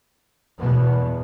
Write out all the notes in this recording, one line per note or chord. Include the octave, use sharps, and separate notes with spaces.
E2 B2 B3